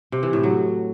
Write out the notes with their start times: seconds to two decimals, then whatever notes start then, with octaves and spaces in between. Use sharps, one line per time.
0.12 C3
0.23 E3
0.33 A2
0.43 F#3